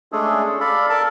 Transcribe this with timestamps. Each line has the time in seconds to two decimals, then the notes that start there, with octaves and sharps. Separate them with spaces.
0.12 G#3 A3 C#4 D4 G#4 A4
0.60 A4 D5 F5 B5
0.90 A4 A#4 A5